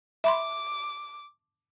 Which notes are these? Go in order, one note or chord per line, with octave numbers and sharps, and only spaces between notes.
E5 B5 C6 D6